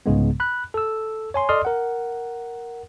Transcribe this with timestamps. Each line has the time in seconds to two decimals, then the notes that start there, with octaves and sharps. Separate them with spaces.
0.06 C2 G#2 C#3 G#3 B3
0.40 B5 F#6
0.74 A4 E6
1.34 C#5 G#5 C6
1.49 A4 D5 D#5 C6 D#6 F6
1.65 A#4 F#5